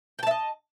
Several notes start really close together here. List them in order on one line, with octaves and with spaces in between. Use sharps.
G5 A5 E5 D#5